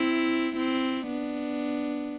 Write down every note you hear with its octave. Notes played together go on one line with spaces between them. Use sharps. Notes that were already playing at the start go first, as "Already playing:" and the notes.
Already playing: C4 E4
C4 E4
B3 D4